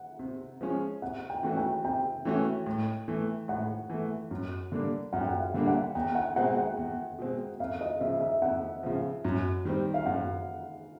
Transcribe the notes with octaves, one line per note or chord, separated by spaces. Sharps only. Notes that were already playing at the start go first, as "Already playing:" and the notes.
Already playing: F#5
C3
F3 G#3 C#4
C3 F#5
G5
E3 A3 C#4 F#4
G5
C3 G5
E3 A3 C#4 F#4
A2
E3 A3
A2 F#5
E3 A3
F#2
D3 G3 A#3 D4
F#2 F#5
G5
F#5
F5
D3 G3 A#3 D4
F#5
E2 G5
F#5
B2 G#3 C4 F#5
F#5
E2
B2 G#3 C4
F2 F5
D#5
C#3 F3 E5
E5
F2 F#5
C#3 F3
F#2
D#3 G3 C4
F5
F#2 F#5